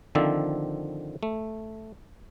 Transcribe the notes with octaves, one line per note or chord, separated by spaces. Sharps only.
D3 D#3 F3 C4 D5 E5
A3